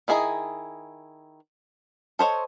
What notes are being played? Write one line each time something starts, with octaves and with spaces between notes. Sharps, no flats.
D#3 E4 G#4 D#5 A#5
A4 C5 C#5 D#5